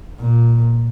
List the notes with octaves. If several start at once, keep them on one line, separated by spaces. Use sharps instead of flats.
A#2